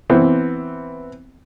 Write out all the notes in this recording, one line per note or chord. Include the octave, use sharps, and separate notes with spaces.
E3 B3 C4